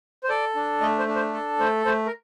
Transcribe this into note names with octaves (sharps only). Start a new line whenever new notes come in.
C5
A4 D5
D4
A3 D#5
C5
D4
C5
A4
A3 C5
A3 C5
A#4